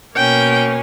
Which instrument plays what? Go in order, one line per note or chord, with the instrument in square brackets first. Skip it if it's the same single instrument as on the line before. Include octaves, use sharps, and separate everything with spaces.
[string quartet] B2 A#3 C#4 G5